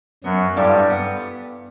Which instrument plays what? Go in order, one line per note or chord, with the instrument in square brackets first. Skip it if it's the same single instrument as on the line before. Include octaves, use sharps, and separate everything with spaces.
[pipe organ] F#2 F#3 [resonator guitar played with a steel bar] B3
[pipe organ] G2 G3 [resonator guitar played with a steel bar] E4 A4 D5 F5
[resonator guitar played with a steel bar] B3